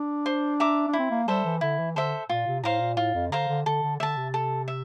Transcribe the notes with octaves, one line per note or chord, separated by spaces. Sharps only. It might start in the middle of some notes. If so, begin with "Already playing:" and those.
Already playing: D4
C5
E5 A#5 D6
D4
E4
C4
A#3
G3 A4 C5 E5
E3
D3 E4
E3
D3 A4 C5 E5
A#2 F4
C3
A2 C5 F5 A#5
A#2
A2 F4
F2
D3 C5 F5 A#5
D3
D3 A4
D3
D3 E5 A5
C3
A4
E5